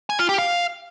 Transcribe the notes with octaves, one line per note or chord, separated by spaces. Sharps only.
G#5
F4
G4
F5